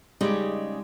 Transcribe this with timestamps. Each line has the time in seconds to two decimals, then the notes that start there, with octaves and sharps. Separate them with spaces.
0.21 C#3 G3 G#3 D#4 G4